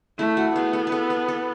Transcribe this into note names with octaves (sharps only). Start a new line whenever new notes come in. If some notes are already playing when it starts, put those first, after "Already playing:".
A3 E4
F#4
B3 G#4
A4
B4
A4
B4
A4